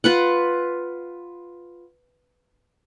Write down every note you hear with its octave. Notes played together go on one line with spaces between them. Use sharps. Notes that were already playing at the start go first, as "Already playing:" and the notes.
F4 B4 F#5